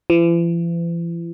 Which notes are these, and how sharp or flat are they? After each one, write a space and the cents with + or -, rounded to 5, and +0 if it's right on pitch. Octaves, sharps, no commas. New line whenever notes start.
E3 +45